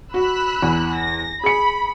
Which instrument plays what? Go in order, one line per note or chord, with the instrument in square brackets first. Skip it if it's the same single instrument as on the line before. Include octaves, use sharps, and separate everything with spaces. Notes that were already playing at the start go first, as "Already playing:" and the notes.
[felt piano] F#4 [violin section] B5 E6 F#6
[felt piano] E2
[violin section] A#6
[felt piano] G#4 C#7 [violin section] B5